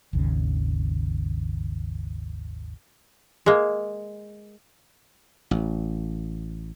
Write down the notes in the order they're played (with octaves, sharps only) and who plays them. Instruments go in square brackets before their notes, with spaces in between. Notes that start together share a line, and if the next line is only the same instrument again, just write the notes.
[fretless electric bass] G#1 D#2 C#3
[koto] G#3 A#3
[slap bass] A1